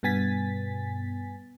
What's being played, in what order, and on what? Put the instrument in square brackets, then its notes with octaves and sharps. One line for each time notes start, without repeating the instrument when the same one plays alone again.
[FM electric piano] G2 B2 B3 G#5 A6 B6